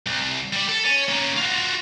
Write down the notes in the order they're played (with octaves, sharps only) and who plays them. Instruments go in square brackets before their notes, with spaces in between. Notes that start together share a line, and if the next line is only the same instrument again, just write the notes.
[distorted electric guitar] C2
G3 D5
A4
C#5 G#5
A#3 C#4
F4 F#4